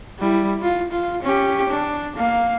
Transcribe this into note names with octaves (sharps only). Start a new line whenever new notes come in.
G3 E4
F4
F4
C#4 G4
D4
A#3 F5